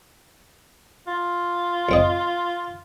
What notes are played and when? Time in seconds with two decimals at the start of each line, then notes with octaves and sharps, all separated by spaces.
1.07 F4
1.89 C#2 C4 D#5